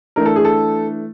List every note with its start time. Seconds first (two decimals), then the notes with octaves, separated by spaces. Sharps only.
0.16 E3 A3 D4 A#4
0.25 A4
0.36 G#4
0.45 A4